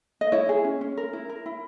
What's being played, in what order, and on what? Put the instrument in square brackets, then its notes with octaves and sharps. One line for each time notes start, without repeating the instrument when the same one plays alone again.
[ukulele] D#5
E4 C#5
G#4
C#4
C#4
A#4
E4
A#4
E4